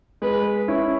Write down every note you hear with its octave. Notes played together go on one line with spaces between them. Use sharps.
G#3 B4
C#4 E4